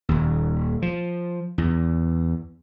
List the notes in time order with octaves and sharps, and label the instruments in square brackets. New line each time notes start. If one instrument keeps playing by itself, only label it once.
[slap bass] D#1 D#2
F3
E2